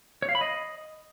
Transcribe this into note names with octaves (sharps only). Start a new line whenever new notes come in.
C#5
F5
B5
D#5